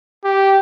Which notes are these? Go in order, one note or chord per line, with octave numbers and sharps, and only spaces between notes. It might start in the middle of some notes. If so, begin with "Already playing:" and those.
G4